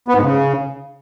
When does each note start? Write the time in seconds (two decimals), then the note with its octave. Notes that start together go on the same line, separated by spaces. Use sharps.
0.08 B3
0.16 G#2
0.23 C#3